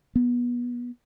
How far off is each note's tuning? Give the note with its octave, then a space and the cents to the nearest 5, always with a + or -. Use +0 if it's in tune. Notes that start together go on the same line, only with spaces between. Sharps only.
B3 -25